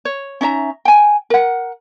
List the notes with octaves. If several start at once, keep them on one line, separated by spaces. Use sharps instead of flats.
C#5
C#4 D#4 E5 A#5
G5 G#5
A#4 F#5